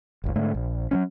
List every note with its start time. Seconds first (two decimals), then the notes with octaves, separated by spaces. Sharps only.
0.24 F#1 C#2
0.36 G#2 D3 A3
0.54 A#1
0.91 F#3 G3 C#4